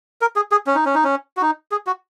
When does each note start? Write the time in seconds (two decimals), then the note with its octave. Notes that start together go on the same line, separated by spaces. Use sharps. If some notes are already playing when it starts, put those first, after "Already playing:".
0.21 A#4
0.36 G#4
0.51 G#4
0.67 C#4
0.75 D#4
0.86 C#4
0.95 D#4
1.04 C#4
1.37 F#4
1.42 D#4
1.71 G#4
1.87 F#4